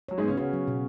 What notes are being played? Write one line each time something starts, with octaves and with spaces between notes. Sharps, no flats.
F#3 C#5
G#2 G#3
C#3 B3 C#4
C#3 C#4 F#4
F#3
B2